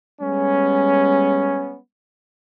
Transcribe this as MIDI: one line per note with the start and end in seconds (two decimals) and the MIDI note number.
0.21 1.77 55
0.21 1.77 56
0.21 1.77 59
0.21 1.77 61